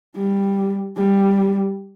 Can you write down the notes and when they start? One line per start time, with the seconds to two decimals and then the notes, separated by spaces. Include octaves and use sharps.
0.16 G3
0.97 G3